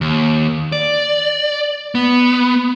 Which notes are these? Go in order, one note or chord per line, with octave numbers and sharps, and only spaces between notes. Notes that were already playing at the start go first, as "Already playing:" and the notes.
D#2
D5
B3